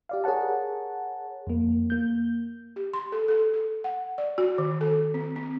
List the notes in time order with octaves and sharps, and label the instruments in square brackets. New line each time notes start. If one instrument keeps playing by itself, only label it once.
[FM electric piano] G4 D5 F5
G#4 A#4 C#5 F#5 A5
F2 A#3
A#3 G6
[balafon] G4
C6
A4
A4
A4
F#5
D5
F#4
D#3
A4
C4
C4